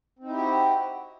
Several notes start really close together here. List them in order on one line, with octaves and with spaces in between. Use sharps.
C4 D#4 E4 G4 F#4